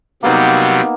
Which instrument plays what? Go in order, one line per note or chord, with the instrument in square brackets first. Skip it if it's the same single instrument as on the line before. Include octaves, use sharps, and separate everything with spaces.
[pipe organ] C3 F#3 G3 [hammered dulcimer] A#3 B3 D#4